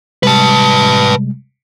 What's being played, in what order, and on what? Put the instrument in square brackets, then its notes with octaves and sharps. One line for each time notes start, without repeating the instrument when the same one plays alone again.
[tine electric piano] C3 G3 G#3 [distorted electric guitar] B4 A5